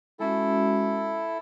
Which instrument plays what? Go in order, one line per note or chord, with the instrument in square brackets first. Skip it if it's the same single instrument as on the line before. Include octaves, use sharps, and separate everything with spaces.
[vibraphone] G#3 C#4 F#4 [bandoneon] E4 A4